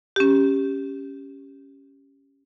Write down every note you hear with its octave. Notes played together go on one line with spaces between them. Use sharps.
C#4 G4